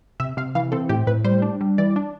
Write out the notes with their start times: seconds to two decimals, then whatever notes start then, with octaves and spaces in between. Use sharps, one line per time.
0.20 C3 E5
0.37 C3 F5
0.55 E3 F5
0.72 C4 A4
0.89 A2 G4
1.07 A2 B4
1.25 G3 C5
1.42 D4
1.61 G3
1.78 E3 D5
1.96 D4